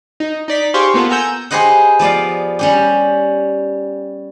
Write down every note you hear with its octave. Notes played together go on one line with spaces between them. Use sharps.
D#4
D#4 D5 B6
G4 G#4 C5 F5 C6 C#6
A#3 B3 F4 A4 B4
F#5 G#5 A#5 E6 G6
G4 G#4 B4 C5 D#5 F#5
F3 B3 D5 F5
G3 C#4 G4